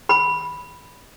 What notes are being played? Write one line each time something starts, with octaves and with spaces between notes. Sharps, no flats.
B5